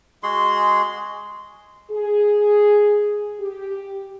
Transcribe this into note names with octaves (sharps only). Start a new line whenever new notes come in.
G#3 F#4 G#4 C6
G#4
G4